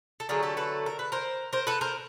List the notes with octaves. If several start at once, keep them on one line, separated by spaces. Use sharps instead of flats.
A4
D3 F#3 A3 G#4 A#4
G4 A4
A4 B4
A#4
B4
A#4 C5
A#4 C5
A4 B4
A#4 C5